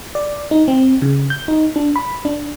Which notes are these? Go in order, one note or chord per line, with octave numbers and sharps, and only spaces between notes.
D5
D#4
C4
C#3
G6
D#4
D4
B5
D4